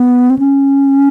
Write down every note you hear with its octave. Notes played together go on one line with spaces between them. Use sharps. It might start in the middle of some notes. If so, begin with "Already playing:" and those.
Already playing: B3
C4
C#4